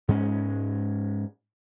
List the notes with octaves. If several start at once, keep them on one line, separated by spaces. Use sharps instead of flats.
G#2 G#3 C#4